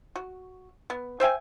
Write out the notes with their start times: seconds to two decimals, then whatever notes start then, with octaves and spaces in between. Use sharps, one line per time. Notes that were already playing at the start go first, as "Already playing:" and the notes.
0.16 F#4
0.90 B3
1.20 C5 E5 G5 G#5